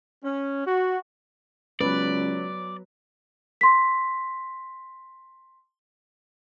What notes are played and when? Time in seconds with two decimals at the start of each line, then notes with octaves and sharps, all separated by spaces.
0.25 C#4
0.67 F#4
1.81 C#2 F#3 B4 D5
3.61 C6 B6